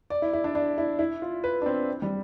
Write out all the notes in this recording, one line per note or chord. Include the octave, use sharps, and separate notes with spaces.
D5
E4
E4
D4
D4
E4
E4
F4
B4
D4
C4
G3